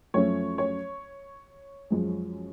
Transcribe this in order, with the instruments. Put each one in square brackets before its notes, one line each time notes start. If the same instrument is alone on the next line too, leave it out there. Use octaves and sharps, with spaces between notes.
[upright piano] F#2 F3 A3 C#4 C#5
C#5
F#2 F3 G#3